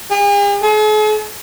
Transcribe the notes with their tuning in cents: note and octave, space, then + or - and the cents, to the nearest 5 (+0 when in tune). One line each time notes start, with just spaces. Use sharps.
G#4 -45
G#4 +45